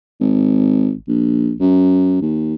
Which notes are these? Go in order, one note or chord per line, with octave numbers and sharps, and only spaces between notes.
G#1
A#1
F#2
D#2